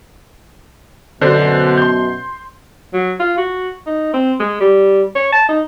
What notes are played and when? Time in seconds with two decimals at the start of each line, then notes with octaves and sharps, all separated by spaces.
1.21 F#2 B2 D3 D4 C5
1.78 C6 G6
2.93 F#3
3.19 F4
3.37 F#4
3.86 D#4
4.14 C4
4.40 G#3
4.60 G3
5.15 C#5
5.32 A5
5.49 D#4